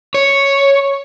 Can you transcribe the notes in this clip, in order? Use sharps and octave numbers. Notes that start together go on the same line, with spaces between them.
C#5